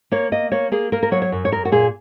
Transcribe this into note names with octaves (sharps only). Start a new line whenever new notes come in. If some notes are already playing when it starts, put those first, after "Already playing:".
A#3 C#5
A#3 D#5
A#3 C#5
A#3 G#4
A#3 A#4
A#4
F#3 C#5
C#5
F#2
C#5
F#2 A#4
F#4
A#2 G#4